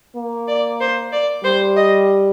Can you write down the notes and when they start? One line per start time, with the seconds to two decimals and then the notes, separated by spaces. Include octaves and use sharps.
0.16 A#3
0.48 D5
0.80 C5
1.12 D5
1.44 G3 C5
1.76 D#5